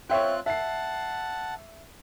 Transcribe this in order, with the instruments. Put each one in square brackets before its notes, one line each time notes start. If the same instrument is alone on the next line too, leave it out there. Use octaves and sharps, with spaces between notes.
[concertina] C4 F4 F#6 [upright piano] C#5 E5 G5
[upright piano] E5 C7 [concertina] F#5 A5